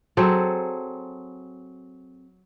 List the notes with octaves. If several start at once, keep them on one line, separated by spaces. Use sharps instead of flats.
F#3 C4 G#4 A4